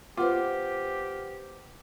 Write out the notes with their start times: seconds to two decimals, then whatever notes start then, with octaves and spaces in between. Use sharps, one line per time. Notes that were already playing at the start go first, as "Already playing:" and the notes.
0.17 B3 F4 G4 B4 C5 F#5 D6